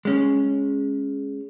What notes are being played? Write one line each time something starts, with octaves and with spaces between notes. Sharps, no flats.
G#3 C#4